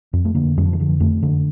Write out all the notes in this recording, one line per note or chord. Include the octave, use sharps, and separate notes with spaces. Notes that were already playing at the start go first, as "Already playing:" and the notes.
F2
A3
D3 A#3
F2 G3
F3
D#3
D3 F3
F2 A3
D3